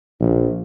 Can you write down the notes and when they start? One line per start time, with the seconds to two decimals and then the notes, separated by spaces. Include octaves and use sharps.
0.20 A#1